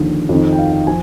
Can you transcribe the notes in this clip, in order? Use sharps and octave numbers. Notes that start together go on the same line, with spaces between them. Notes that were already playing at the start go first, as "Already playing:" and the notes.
Already playing: D#2 D3 F3
F2 D#3
G5
F5
F5
F3 G#5